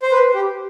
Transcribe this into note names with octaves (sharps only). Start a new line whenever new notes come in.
C5
B4
G4